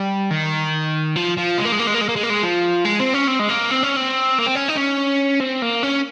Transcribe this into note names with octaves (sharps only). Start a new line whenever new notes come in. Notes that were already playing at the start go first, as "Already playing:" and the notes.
Already playing: G3
D#3
F3
F3
G#3
A#3
G#3
A#3
G#3
A#3
G#3
A#3
G#3
A#3
G#3
F3
G#3
C4
C#4
C4
G#3
A#3
C4
C#4
C4
A#3
C4
C#4
D#4
C#4
C4
A#3
C#4